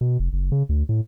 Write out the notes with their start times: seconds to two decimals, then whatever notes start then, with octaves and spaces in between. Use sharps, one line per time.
0.01 B2
0.19 F1
0.33 F#1
0.52 C#3
0.69 D2
0.89 A2